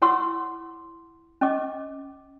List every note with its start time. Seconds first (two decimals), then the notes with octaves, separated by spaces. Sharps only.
0.02 E4 C#5 F#5 C6 D6 E6
1.41 C#4 D#5 D6